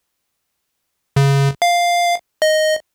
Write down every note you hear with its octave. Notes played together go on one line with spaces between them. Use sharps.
C#3
F5
D#5